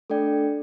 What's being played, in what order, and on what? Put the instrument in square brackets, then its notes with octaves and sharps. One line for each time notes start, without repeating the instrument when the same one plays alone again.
[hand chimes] A3 D4 A4 D5 G5